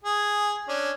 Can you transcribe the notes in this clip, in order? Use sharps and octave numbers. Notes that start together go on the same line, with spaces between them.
G#4
C#4 D4